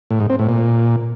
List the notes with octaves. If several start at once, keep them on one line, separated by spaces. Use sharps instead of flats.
A2
G#2
C4
A2
A#2